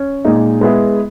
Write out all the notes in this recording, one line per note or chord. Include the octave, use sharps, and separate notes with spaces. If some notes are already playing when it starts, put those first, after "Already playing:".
Already playing: C#4
A#2 G#3 D#4
G#3 B3 E4 G#4